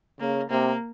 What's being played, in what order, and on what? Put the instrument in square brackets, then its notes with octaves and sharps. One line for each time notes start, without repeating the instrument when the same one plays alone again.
[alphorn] C#3 [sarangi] A#3
[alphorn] C3 [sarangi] A#3